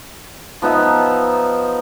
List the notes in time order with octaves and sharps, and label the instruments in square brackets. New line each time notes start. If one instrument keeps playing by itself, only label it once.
[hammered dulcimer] F3 B3 D#4 E5